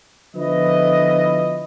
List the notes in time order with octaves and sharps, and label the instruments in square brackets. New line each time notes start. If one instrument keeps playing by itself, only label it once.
[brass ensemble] D3 F3 B3 E4 B4 D#5